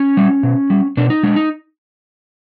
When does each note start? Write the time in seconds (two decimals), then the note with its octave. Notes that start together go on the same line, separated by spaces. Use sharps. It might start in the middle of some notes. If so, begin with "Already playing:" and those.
Already playing: C#4
0.17 G3
0.43 B2
0.70 G3
0.97 B2 D4
1.10 D#4
1.23 G#3 D4
1.36 D#4